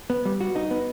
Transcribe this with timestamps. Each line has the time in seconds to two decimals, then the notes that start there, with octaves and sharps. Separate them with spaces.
0.10 B3
0.26 G3
0.41 F#4
0.56 D#4
0.71 B3